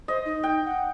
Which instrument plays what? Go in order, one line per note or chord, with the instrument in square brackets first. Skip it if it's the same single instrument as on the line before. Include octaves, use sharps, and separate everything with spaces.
[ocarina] C5 [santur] D#5
[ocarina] D#4
[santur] G5
[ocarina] F#5